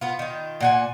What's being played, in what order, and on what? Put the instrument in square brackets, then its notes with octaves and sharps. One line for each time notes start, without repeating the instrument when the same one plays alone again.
[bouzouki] B3 F4
D#3 F4
A#2 F#5 G#5